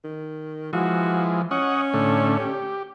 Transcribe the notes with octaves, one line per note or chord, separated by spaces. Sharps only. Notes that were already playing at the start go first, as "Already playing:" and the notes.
D#3
E3 F3 G#3 F#4
C#4 C#5 D#5 F#5
A2 D3 A3
G4